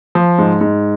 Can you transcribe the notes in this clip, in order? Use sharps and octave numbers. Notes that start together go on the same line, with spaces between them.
F3
G#2
G#2